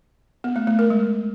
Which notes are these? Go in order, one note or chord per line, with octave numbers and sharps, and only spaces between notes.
B3
A3
A3
A#4
G#3